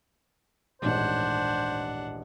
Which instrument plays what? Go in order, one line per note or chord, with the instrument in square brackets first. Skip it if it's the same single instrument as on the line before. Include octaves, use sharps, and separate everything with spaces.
[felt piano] D#1 A1 G#2 [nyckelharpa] D4 F#5 [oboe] C5